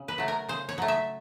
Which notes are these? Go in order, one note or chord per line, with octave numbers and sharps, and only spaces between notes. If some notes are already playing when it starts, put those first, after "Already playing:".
Already playing: C#3
B4
F#3 A3
A#4
C#3 C5
C#5
F#3 A3
E5